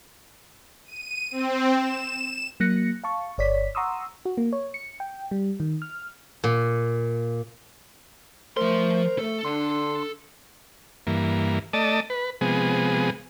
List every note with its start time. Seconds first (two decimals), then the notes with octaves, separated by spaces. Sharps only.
0.85 D#7
1.31 C4
1.75 E7
2.60 F#3 A#3 F#6 A#6 C#7
3.04 F5 A5 C#6
3.38 G1 C#5 D5 B6
3.75 F#5 A#5 C6 C#6 D#6 E6
4.25 F#4
4.37 A#3
4.53 C#5
4.74 C#7
5.00 G5
5.31 G3
5.60 D#3
5.82 F6
6.44 A#2
8.57 F3 A3 A#4 C5 C6
9.18 A3 A4
9.45 D3 D4 C6
11.07 G2 E3 A#3
11.73 A3 D5 D#5 A5
12.10 B4
12.41 C3 F3 G#3 B3 G#4